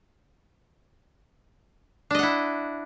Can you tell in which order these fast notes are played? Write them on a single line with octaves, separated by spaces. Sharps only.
D4 D#5 F#5 E4